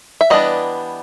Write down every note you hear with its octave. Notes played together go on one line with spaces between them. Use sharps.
E5
E3 G3 B3 D4 D#5